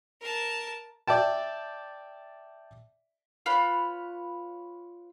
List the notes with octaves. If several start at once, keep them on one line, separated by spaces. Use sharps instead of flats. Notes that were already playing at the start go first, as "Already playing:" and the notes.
A#4 A5
D5 E5 G5 A5
F4 B4 C#5 B5